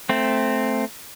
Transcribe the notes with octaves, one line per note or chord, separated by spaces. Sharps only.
A3 C4